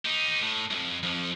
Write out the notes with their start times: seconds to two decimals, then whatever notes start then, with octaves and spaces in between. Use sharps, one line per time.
0.05 D#4 G4
0.41 A2
0.71 C2 F2
1.03 F2 F3